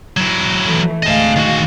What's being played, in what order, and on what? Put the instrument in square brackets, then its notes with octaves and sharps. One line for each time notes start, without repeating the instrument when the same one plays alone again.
[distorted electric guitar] F#3 E4
[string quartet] E3 A3
[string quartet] D2 G#3 F5 [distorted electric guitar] D#5 A5
[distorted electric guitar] D#3 F#4